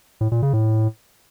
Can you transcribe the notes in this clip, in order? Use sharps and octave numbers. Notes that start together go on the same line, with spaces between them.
A2
A#2
C#3
A2